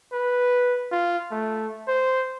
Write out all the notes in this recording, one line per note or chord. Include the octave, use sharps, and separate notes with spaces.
B4
F4
A3
C5